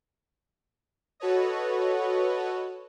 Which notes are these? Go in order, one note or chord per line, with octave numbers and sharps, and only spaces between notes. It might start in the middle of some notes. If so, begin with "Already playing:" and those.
F#4 A4 B4 C#5 D#5